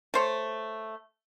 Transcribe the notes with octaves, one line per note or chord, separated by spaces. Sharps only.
A3 C5 C#5